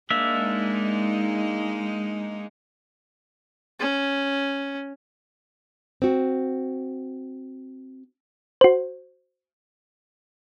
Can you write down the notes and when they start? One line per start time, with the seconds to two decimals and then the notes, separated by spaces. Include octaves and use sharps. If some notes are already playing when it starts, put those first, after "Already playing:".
0.10 G#3 A#3 D4 D#4 E5
3.80 C#4
6.02 C4 F#4
8.61 F#4 C5